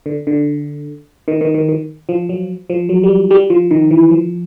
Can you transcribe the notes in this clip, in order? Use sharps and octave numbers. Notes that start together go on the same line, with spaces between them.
D3
D3
D#3
D#3
D#3
D#3
F3
F#3
F3
F#3
G3
G3
F3
D#3
E3
F3